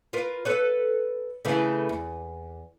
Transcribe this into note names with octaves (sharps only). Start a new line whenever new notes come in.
F4 A#4 B4
A4 B4 C#5
C#3 E3 A3
E2